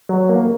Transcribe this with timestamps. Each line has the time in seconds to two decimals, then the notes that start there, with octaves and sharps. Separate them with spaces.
0.09 F#3
0.29 A#3